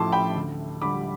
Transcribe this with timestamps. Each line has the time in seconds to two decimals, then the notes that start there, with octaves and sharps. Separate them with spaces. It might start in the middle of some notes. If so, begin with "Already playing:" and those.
Already playing: A1 A2 F3 A5 C6 D6
0.12 G5 B5
0.35 D2
0.82 D3 G3 B5 D6